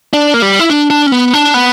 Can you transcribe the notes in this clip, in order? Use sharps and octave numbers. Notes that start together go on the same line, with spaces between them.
D4
A#3
G3
E4
D4
D4
C#4
B3
D4
B3